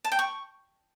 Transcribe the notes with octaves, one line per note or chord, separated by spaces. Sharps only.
A5
G5
C#6